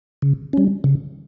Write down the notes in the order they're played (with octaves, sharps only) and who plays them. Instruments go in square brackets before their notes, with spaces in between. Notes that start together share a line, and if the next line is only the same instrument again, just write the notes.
[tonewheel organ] C#3
G3 C#4
C#3